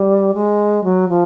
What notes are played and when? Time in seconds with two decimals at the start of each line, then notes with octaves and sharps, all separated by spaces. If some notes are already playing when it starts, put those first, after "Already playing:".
Already playing: G3
0.34 G#3
0.84 F#3
1.09 F3